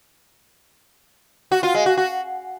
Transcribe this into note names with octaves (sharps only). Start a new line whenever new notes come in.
F#4
F4
G#3
F#4
F#4